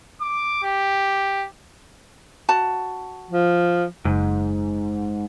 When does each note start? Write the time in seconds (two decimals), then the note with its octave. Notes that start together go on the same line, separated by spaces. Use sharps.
0.22 D6
0.63 G4
2.49 F#4 A5
3.31 F3
4.05 F#1 G#2